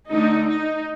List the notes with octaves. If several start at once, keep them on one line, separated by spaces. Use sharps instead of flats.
D3 A3 D4 D#4
D#4